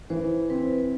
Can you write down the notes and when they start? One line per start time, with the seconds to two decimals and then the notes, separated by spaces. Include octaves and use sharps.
0.10 E3 C5
0.50 C4 B4